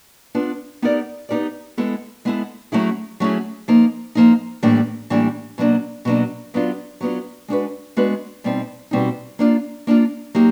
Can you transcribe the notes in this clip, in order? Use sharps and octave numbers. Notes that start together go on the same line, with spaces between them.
B3 D4 F4
B3 D#4 G4 A#4 D5
B3 D#4 G4 A#4 D5
G#3 B3 E4 A4
G#3 B3 E4 A4
F#3 A3 C#4 E4 G#4
F#3 A3 C#4 E4 G#4
F3 A#3 D#4
F3 A#3 D#4
A2 E3 G3 A#3 D4
A2 E3 G3 A#3 D4
B2 F#3 A#3 D4
B2 F#3 A#3 D4
F#3 B3 D4 F4
F#3 B3 D4 F4
G#3 B3 D4 F#4 B4
G#3 B3 D4 F#4 B4
B2 G3 C4 D#4
B2 G3 C4 D#4
A#3 D4 F4
A#3 D4 F4
F#3 A#3 D#4 G4